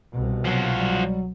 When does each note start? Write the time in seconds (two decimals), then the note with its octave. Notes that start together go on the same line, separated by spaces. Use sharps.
0.13 C2 B2
0.45 F3 F#3 F#4
0.76 F#3 G3